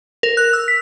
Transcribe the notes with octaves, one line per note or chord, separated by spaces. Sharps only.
A#4
F#6
E6
B6